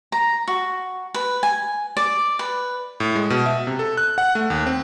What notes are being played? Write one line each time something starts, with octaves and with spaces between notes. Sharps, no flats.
A#5
F#4
B4
G#5
D5
B4
A2
G#3
B2
E5
C3
A4
F#6
F#5
A3
D#2
C4